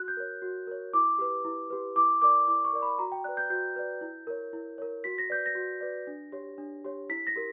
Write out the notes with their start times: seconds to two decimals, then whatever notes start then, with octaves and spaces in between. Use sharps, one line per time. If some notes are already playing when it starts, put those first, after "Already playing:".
Already playing: F#4 F#6
0.08 G6
0.17 A#4 C#5
0.42 F#4
0.67 A#4 C#5
0.93 E4 D6
1.18 G4 B4
1.45 E4
1.70 G4 B4
1.96 E4 D6
2.22 A#4 D5 D6
2.48 E4 D6
2.65 C#6
2.73 A#4 D5
2.82 B5
2.99 F#4 A#5
3.12 G5
3.24 B4 D5 F#6
3.37 G6
3.50 F#4 G6
3.76 B4 D5
4.01 E4
4.27 A#4 C#5
4.53 E4
4.78 A#4 C#5
5.04 F#4 B6
5.18 A#6
5.30 B4 D5 G6
5.46 A#6
5.55 F#4
5.81 B4 D5
6.07 D4
6.32 G4 C#5
6.58 D4
6.85 G4 C#5
7.09 E4 B6
7.27 A#6
7.36 G4 A#4